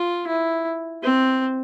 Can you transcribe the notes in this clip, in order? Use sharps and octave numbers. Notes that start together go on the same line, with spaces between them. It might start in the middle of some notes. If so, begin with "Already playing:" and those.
Already playing: F4
E4
C4